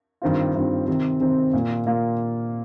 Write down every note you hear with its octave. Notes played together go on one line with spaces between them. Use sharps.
G2 D#3 C4 F4
G2 D#3 C4 F4
C3 D#3 C4
C3 D#3 C4
A#2 A#3 F4
A#2 A#3 F4